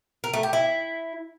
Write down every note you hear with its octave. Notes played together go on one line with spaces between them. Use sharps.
A#4
A3
G4
E4